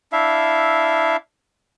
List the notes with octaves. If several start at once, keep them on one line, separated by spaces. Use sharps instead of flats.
D4 E4 E5 F5